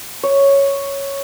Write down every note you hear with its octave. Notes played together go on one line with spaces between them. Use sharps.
C#5